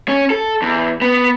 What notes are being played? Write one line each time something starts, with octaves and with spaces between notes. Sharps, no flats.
C#4
A4
E2
B3